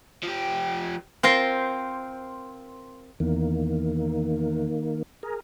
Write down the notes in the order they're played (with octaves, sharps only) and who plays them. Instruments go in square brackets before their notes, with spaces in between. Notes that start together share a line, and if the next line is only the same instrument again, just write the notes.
[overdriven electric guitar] F3 G4
[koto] C4 F4 A#4 C5
[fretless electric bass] E2 [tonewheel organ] D#3 A#3
[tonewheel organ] G#4 A#4